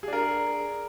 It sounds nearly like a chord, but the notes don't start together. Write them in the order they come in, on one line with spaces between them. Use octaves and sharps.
G#4 D4 A#4